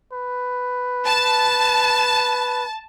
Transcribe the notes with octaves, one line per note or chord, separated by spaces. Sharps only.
B4
A5